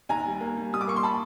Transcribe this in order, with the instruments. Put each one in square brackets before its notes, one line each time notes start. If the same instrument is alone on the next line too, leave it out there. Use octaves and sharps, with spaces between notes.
[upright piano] D#2 G#5 A#5
G3
A#3
G3
G3 D#6
D6
A#3 C#6
C6
A5 B5